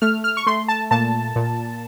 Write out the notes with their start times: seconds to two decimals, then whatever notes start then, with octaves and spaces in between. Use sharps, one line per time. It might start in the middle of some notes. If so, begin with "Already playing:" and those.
0.02 A3 F6
0.24 F6
0.37 C#6
0.47 A3 C6
0.68 A5
0.91 A#2 A5
1.36 A#2